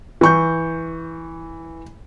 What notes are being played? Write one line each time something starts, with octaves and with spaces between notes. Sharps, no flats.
E3 C#6 G6